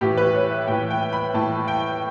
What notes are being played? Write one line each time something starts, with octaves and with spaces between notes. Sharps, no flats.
A2 E3 G4
B4
C#5
E5
A2 E3 G5
G5
B5
A2 E3 A5
G5